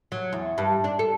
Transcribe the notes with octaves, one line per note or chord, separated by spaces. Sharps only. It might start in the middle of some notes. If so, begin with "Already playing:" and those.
F#3
E2
G2
D4
A4